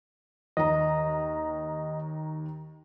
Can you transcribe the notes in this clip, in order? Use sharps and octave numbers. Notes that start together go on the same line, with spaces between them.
D#2 D#5 A#5